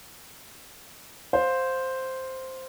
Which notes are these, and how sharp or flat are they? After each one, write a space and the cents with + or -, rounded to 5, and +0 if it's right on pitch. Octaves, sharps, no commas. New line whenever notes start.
C5 +0 F5 +20